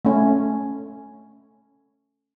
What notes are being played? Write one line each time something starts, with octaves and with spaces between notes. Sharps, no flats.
A3 C#4